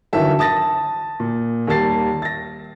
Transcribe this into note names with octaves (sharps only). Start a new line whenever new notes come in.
G1 D#3 E3 F#3 E5 A5
A5 D#6 A6 A#6
A#2
D#2 G3 A#3 A5 A6 C7
A6 A#6